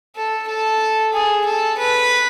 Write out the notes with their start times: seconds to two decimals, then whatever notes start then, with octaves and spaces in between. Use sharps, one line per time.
0.16 A4
0.48 A4
1.13 G#4
1.45 A4
1.78 B4